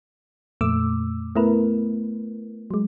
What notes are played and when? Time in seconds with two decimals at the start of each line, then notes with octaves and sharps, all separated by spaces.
0.61 F2 A#2 A3 D6 E6
1.36 A3 B3 E4 A#4 B4
2.71 F#3 G#3